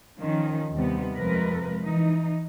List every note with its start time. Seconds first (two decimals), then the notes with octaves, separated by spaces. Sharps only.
0.18 D#3 F3 C#4
0.74 D#2 C3 G3 B3
1.16 F2 C3 F3 G#3 A#4 B4
1.84 E3 D#4